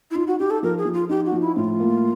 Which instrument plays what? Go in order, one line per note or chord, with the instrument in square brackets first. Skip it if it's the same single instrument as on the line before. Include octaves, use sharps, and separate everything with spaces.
[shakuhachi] E4
[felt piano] D#4 [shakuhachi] F4
[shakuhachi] F#4
[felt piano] D#4 [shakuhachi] G4
[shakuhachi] A4
[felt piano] F3 [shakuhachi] A#4
[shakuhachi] G#4
[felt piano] F3
[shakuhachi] F4
[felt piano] D#4 [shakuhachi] G4
[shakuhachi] F#4
[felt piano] F3
[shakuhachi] E4
[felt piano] A2 [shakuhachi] F4
[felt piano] A#3